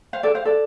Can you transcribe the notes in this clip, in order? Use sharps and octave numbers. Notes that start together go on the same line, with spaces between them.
C5 F5
A4 D5
C5 F5
A4 D5